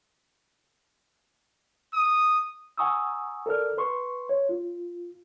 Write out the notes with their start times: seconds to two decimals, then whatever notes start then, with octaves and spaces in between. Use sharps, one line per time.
1.94 D#6
2.77 F#5 G#5 A#5 C#6 D#6 E6
3.46 A4 A#4 D5 F6
3.78 B4 C6 C#6
4.29 C#5
4.49 F4